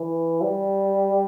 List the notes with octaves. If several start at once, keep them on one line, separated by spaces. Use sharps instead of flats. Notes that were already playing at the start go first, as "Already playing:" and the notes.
Already playing: E3
G3